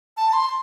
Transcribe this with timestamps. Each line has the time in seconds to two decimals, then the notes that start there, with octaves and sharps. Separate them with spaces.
0.17 A5
0.33 C6